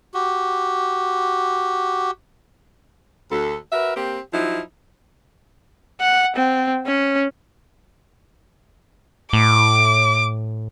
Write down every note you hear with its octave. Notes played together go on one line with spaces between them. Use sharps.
F#4 G4
D2 A4
F#4 A#4 B4 E5
A#3 C4 G4
F3 F#3 D#4 E4
F#5
C4
C#4
A2 D6